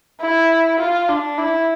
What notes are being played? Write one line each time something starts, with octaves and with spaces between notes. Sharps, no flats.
E4
F4
D4
E4